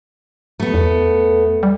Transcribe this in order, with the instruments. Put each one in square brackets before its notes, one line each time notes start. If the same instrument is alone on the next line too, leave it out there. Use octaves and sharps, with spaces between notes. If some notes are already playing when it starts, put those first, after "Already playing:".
[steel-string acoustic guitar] A3 B3
[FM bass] E2
G3